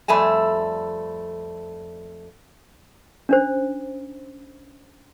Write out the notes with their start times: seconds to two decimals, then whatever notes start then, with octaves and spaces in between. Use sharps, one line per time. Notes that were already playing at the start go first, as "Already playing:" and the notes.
0.08 F2 G3 A3 G#5 A5
3.29 C#4 D4 C5